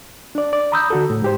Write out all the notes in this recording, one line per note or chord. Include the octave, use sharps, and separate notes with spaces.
D4 D5
D5
A#5 B5 D#6 E6 G6
D3 F#4 A4
A2
G#2 G4 C5